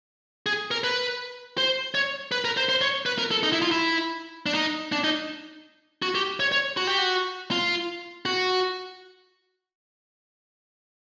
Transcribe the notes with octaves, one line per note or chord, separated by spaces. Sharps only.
G#4
A#4
B4
C5
C#5
B4
A#4
C5
C5
C#5
B4
A#4
A4
D#4
E4
F4
E4
D4
D#4
D4
D#4
F#4
G4
C#5
C#5
F#4
G4
F#4
F4
F#4